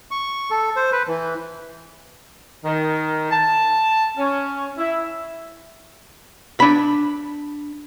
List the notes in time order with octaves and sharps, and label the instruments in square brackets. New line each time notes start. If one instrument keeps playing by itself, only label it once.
[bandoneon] C#6
A4
C5
B4
E3
[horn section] D#3
A5
C#4
E4
[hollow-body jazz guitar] D4 B5